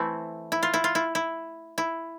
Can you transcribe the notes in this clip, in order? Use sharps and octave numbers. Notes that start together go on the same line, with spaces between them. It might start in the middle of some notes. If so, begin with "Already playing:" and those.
Already playing: E3 A3 C4 E4
E4
F4
E4
F4
E4
E4
E4